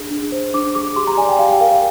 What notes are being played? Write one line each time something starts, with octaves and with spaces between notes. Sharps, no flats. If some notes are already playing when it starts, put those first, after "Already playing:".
Already playing: D4 G#4
D4
C5
D4 D6
G#4 D6
G4 C6
A#5
D5 G#5
G5
G4 F5
G5
A#4 F5
F5